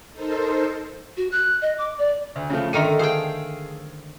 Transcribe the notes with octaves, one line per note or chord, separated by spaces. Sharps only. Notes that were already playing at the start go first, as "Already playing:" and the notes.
D#4 A4 A#4 C5
F#4
F#6
D#5
D6
D5
D2
C#3 F3 A3
D3 D#3 A3 A#5 F6 D#7
G#4 A4 C5 F5 G5